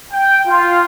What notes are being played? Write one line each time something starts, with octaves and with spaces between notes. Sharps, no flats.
G5
F4